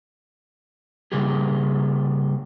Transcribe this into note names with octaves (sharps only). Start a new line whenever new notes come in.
C#3 G3 A#3 G4 G#4